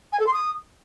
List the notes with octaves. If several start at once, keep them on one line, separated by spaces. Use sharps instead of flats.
G#5
A4
C6
D#6